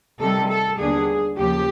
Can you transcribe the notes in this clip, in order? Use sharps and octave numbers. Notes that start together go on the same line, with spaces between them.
C3 D#3 G3 A4
A4
D#2 D3 G3 B3 D4 G#4
D#2 C#3 F3 G4